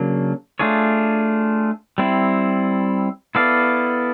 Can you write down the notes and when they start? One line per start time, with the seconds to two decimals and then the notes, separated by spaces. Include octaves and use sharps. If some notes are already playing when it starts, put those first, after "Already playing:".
Already playing: C#3 F#3 A#3 D4
0.59 A3 D4 F4 G#4 C#5
1.98 G3 C4 E4
3.35 B3 E4 A4 D5 F5